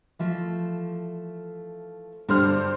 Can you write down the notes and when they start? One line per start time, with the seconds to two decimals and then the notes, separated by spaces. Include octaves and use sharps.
0.19 E3 F3 A3
2.29 G2 B2 D3 G3 C5 F6